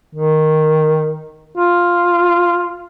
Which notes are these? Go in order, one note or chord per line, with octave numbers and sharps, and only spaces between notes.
D#3
F4